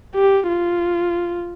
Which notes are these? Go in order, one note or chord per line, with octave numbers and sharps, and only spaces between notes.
G4
F4